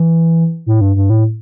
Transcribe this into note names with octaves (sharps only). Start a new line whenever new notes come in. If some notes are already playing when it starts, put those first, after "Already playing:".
Already playing: E3
A2
G2
G2
A2